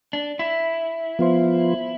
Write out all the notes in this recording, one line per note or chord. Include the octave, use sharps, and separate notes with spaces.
D4
E4
F3 B3 F4 C5